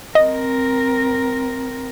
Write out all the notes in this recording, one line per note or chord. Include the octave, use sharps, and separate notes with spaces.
C4 A#4 D#5